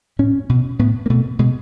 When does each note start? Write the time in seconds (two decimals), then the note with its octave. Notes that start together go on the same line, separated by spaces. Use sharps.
0.19 A2 C#4
0.49 B2
0.79 A2 B3
1.06 A#3
1.10 B2 A3
1.39 B2 G#3